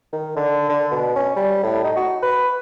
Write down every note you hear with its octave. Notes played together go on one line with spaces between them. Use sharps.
D#3
D3
D3
B2
C#4
G3
A2
D#4
F#4
B4